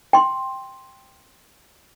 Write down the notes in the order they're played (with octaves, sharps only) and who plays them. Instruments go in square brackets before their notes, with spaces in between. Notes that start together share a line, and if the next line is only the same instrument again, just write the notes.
[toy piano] G5 C6